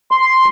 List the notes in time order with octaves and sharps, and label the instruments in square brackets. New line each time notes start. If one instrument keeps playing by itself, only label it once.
[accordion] C6